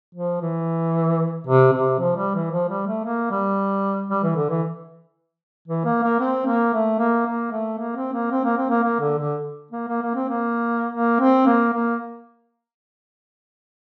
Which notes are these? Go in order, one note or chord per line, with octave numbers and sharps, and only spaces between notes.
F3
E3
C3
C3
F3
G3
E3
F3
G3
A3
A#3
G3
G3
E3
D3
E3
E3
A#3
A#3
C4
A#3
A3
A#3
A#3
A3
A#3
C4
A#3
C4
A#3
C4
A#3
A#3
D3
D3
A#3
A#3
A#3
C4
A#3
A#3
C4
A#3
A#3